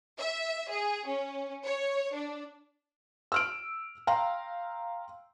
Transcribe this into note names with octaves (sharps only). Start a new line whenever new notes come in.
E5
G#4
C#4
C#5
D4
E6 F6 D7
F5 G5 A#5 C6